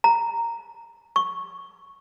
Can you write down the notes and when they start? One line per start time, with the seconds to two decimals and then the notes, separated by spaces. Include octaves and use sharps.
0.04 A#5
1.16 C#6